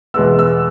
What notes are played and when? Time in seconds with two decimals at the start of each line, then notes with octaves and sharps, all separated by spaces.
0.14 E2 B2 G#3 B3 E6
0.39 E6